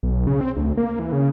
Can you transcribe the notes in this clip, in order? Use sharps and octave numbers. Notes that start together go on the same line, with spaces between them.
B1
C#3
C4
D2
A#3
E3
C#3